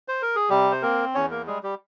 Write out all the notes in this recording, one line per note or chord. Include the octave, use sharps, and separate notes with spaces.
C5
A#4
G#4
C3 G3 G4
C5
A#3 C4 A#4
E2 C#4 C#5
A#3 A#4
G3 G#3 G#4
G3 G4